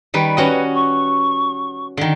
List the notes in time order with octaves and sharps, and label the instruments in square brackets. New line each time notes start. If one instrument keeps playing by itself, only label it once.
[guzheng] D#3 G3 B4
[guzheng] C#4 F#4 D#5 [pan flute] B4
[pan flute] C#6
[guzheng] D3 D#3